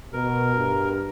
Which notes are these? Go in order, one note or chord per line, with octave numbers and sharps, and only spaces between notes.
B2 A#4
G2